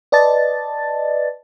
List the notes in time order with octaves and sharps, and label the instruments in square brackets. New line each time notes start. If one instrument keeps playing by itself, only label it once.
[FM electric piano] B4 D5 D#5 A5 A6